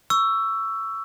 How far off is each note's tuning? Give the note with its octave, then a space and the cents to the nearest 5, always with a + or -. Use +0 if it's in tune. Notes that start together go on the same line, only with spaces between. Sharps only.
C#6 +20 E6 +10